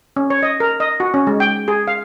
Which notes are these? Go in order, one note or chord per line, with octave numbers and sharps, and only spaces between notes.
C#4
C#5
D#5
A#4
D#5
F#4
C#4
G#3
G5
G#4
F5